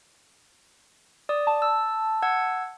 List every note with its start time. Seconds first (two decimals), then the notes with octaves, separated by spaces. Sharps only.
1.29 D5 D#6
1.47 A5
1.62 E6
2.23 F#5 E6 G#6